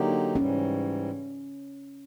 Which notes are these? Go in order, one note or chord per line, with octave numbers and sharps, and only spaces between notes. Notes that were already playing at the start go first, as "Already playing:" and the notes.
Already playing: D3 F#3 A#3 D#4 G4
G#2 E3 G3 C#4